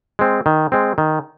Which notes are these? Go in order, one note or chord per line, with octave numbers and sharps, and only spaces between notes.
G#3 C4
D#3
G#3 C4
D#3